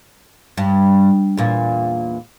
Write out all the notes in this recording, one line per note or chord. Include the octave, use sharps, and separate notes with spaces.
G2
E2 A#2